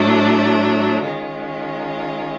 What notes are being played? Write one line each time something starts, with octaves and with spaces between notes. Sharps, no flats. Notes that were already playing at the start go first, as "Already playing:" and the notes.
Already playing: A2 F#3 A3 D4
D#3 G#3 C#4 F4